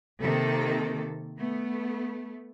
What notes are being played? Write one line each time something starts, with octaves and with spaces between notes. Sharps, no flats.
C3 D#3 A#3 A4
A3 B3